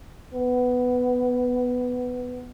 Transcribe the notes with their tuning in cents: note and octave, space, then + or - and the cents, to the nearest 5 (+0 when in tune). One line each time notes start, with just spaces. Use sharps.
B3 +10